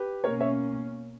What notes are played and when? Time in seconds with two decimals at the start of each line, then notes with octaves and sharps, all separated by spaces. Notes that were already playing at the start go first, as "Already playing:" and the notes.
Already playing: G4 B4
0.23 B2 A#3 C#4 A#4 C#5
0.40 C#5 E5